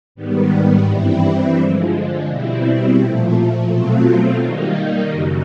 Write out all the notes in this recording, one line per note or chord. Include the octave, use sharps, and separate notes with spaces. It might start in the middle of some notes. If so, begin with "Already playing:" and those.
G#2 D#3 G3 B3
G2 E3 G3 C4 E4
D3 F3 G#3
B2 G3 C4 E4
A#2 F3 A3
B2 F#3 A3 C4 F4
D#3 G3 A#3 D#4
F#2 C#3 F#3